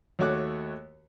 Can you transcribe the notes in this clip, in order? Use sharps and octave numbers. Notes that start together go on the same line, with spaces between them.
D#2 A3 F#4 C#5 D6 F#6